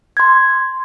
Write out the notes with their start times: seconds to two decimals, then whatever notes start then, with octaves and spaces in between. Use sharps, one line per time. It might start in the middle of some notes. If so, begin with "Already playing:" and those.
0.17 C6 G#6